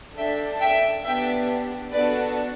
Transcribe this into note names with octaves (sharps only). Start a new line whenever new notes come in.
D4 A4 E5 G5
E5 G5
B3 D4 G4 E5 G5
B3 D4 F#4 A4 B4 D5